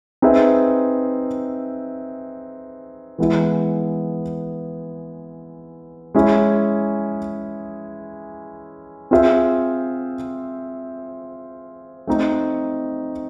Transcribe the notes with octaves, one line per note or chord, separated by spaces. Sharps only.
C4 D#4 G#4 B4 E5
E3 G#3 B3 E4
G#3 C#4 E4 G#4
C4 F4 G#4 C5 E5
A3 C4 D#4